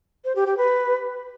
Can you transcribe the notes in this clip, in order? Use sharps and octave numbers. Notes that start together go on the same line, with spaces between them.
C5
G4
G4
B4